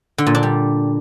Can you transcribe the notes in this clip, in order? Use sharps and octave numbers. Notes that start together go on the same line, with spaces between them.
D3
A#2
D4
G3